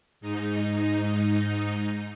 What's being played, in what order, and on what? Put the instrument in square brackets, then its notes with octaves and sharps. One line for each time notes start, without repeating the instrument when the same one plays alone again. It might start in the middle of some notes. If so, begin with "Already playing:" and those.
[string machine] G#2 D#4